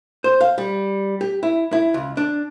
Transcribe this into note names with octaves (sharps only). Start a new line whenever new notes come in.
C5
F5
G3
G4
E4
E4
C#2
D4